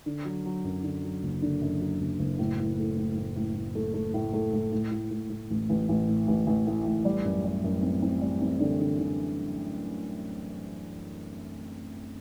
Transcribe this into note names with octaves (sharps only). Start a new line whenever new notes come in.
D3
F#3
F#3
F#2
D3
F#3
F#1
D3
F#2
F#3
F#1
F#1
A2
A2
A3
A2
A2
A2
A2
A3
A3
A2
A3
A2
A2
A2
A2
A2
A1
A1
A1
A2
A1
A1
A2
A1
G3
F#2
G3
F#2
C4
C4
G3
C4
D3
D3
D3